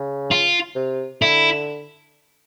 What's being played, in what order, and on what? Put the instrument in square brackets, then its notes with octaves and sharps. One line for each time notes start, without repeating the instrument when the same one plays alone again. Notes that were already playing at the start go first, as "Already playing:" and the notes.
Already playing: [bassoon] C#3
[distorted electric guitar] F4
[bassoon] C3
[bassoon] D3 [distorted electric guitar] E4